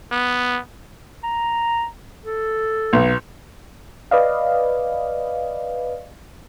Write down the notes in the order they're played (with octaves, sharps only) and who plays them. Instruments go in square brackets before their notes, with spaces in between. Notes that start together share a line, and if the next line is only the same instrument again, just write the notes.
[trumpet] B3
[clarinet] A#5
A4
[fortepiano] B1
[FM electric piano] B4 D5 D#5 F5